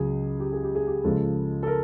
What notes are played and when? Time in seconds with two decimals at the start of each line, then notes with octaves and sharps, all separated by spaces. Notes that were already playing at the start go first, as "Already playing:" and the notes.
Already playing: C#2 C#3 F#3 G#4
0.40 G4
0.53 G#4
0.64 G4
0.75 G#4
0.87 G4
1.04 C#2 C#3 F3 G#3 A4
1.63 A4
1.67 A#4